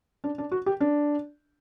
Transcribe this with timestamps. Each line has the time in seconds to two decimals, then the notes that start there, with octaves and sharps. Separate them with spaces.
0.24 D4
0.38 D4
0.52 F#4
0.66 G4
0.81 D4